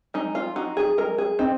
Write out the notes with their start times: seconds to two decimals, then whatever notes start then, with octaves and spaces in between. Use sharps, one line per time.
0.14 G#3 D#4
0.35 F4
0.56 D#4 F#4
0.77 G#4
0.98 G#3 A#4
1.18 G#4
1.39 C4 D#4